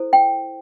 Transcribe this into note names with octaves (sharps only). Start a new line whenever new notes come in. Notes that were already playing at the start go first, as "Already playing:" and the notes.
Already playing: E4 A4 C5
G5